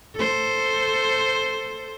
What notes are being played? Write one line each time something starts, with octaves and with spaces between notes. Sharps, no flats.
A4 C5